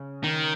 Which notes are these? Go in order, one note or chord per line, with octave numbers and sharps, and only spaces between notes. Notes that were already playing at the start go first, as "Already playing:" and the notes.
Already playing: C#3
D#3